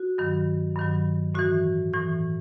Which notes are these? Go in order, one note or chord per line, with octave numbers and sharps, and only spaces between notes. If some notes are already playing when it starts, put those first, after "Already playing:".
Already playing: F#4
G2 D#3 F#3
G2 D#3 F#3
A2 E3 F#4
A2 E3